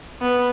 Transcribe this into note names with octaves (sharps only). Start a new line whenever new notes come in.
B3